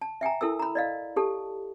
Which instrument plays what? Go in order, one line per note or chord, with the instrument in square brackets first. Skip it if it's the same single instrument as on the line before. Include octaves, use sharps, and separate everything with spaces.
[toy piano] A5
E5 G5 G#5 A#5
E4 A4 A#4 E6
A#5 B5
D5 D#5 F5
G4 A4 A5